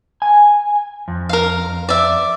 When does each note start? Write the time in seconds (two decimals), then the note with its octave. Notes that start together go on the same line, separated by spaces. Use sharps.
0.22 G#5
1.08 F2
1.29 A#4 F5
1.89 D5 E5